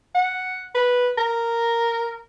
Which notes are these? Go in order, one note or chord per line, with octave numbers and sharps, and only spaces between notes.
F#5
B4
A#4